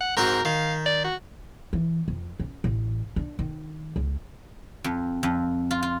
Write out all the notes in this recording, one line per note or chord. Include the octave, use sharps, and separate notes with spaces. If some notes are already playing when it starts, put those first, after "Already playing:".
F#5
G#2 C4 F#4 A#4
D#3 F5
D5
F#4
E3
F2
C#4
A1
D4
D#3
C#2
F2
F2
F4
F4